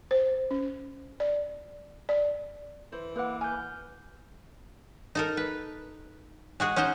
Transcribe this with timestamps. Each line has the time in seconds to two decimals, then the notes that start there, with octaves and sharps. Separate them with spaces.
0.11 C5
0.51 C#4
1.20 D5
2.09 D5
2.92 E3 C5
3.16 A#3 B4 C5 F#5 D6
3.41 B4 G#5 F6 G6
5.15 D#4 A4 A#4
5.37 B4
6.60 G#3 F#4 G#4
6.76 C#4 D#4 F#4 C5 D#5